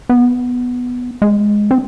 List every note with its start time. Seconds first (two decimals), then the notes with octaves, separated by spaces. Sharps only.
0.09 B3
1.22 G#3
1.71 C4